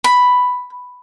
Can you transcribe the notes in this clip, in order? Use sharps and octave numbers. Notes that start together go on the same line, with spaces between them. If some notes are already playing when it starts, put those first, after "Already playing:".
B5